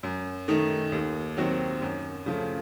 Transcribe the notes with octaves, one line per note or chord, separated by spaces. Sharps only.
F#2
D#3 A3 D#4
D#2
D#3 F#3 C4 F#4
F#2
C#3 F3 A3